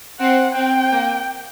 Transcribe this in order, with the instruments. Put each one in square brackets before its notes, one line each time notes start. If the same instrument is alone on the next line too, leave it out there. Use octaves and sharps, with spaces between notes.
[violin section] C4 [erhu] F#5
[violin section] C4 [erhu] G5
[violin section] A#3